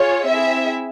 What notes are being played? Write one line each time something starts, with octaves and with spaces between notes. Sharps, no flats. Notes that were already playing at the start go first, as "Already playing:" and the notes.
Already playing: F4 G#4 C#5
C4 E4 G#4 E5